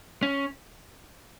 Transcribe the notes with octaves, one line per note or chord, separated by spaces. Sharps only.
C#4